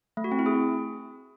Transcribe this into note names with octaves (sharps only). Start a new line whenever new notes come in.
A3
F#4
C4
E4
G#4